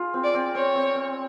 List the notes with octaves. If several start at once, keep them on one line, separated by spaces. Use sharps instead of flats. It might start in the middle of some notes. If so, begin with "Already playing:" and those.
Already playing: F4 G#4
C4
D5
C4
C4 C#5
C4
C4